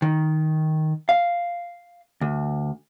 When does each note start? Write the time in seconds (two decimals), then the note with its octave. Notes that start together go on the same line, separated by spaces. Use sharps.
0.02 D#3
1.09 F5
2.21 D2